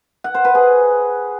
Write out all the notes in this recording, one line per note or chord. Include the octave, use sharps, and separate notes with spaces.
F#5
C5
B4
G#4